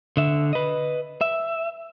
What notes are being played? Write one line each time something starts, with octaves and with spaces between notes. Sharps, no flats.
D3 E5
B4 D#5
E5